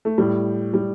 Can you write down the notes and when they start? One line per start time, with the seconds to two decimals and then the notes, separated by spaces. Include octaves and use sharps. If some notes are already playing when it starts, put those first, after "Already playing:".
0.05 A3
0.18 A2 G3
0.73 A2 G3